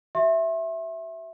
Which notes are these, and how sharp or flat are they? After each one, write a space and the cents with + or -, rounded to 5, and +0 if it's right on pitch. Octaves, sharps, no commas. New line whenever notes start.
F#4 +40 E5 +0 C6 +40